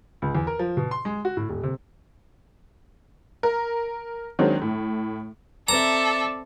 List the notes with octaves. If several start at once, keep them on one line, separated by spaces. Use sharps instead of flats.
C#2
E2
A#4
F3
B2
C6
G#3
F#4
A2
D#1
C3
A#4
D#3 F#3 G#3 C4 D4
A2
C4 A4 D5 E5 A#5